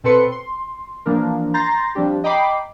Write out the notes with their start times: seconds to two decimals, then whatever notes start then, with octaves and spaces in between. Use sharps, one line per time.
0.04 B2 C4 A4 B4 C6 C#7
0.32 C6
1.06 E3 F3 A#3 D4 A#4
1.54 A#5 C6 G6 A6 A#6 C7
1.95 F3 G3 C4 D4 G4
2.24 D#5 G5 A#5 B5 D6 C7